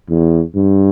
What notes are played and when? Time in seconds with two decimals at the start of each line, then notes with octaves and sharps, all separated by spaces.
0.09 E2
0.56 G2